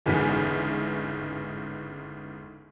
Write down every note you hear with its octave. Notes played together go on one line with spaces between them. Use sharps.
G1 E2 G#2 C#3 B6